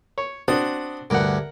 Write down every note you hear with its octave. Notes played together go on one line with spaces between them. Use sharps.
C#5
C4 D4 F#4 D#6
D2 G2 A#4 F#5